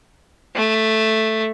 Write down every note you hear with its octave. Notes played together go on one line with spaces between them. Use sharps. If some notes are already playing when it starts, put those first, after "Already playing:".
A3